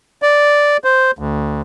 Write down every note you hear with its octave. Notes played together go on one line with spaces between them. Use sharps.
D5
C5
D2